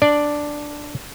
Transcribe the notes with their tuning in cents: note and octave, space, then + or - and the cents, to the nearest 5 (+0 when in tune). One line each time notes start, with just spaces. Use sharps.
D4 +0 D5 +0